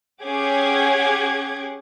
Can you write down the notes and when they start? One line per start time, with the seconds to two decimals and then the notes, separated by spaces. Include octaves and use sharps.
0.23 C#4 G4 G#4 F#5 D6 G#6